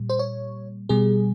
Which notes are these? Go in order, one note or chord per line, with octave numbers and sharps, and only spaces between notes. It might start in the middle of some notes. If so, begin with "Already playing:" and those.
Already playing: A#2 G3
C5
C#5
B2 G3 G#4